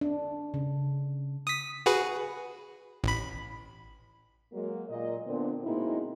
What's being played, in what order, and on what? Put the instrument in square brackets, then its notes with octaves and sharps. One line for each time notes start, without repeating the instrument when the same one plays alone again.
[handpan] D4
C#3
[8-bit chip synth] D#6 B6
F#4 G#4 B4
A1 B5
[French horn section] F#3 G#3 A#3
A#2 D#5
A#2 D3 B3 C4 D4
B2 G#3 A#3 C4 D#4 E4